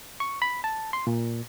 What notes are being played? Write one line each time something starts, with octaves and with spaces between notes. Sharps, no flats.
C#6
B5
A5
C6
A#2